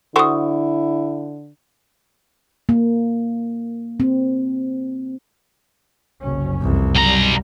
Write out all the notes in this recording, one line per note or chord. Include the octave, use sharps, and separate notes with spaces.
D3 E4 F#4 A4 C5 C#6 D#6
A#3
C4
F#1 C2 C#4
C2 F2 E3
B1 F#2 G3 A#5